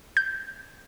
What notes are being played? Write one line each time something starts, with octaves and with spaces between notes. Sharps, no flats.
G6